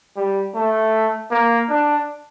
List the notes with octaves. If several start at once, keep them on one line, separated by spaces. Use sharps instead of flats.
G3
A3
A#3
D4